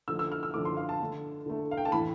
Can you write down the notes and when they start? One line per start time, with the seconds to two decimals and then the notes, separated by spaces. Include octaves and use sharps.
0.08 D3 F3 A3 E6
0.19 E6
0.32 F6
0.43 E6
0.54 D3 F3 A3 D6
0.65 C6
0.77 F5
0.89 A5
1.00 D3 A3
1.46 D3 A3
1.71 F5
1.77 G5
1.85 A5
1.92 A2 E3 A3 B5